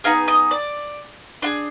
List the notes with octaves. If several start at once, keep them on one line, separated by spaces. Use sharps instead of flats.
B3 D#4 G#4 F5
D#5
D5
D4 F4 G#4